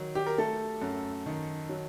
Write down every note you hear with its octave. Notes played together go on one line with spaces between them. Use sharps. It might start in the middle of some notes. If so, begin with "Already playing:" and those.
Already playing: D#3 F#3
G4
A#4
A3 A4
F#2
D#3
F#3